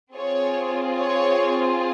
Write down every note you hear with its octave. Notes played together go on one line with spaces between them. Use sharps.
C4 F4 G#4 C#5
C#5